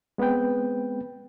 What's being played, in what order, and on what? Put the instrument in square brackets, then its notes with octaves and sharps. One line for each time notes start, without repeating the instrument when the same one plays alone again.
[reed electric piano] G#3 B3 C4 B4 G5